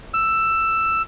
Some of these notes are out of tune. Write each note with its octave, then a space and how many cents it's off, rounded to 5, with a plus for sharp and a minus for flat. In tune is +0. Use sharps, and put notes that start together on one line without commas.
E6 +10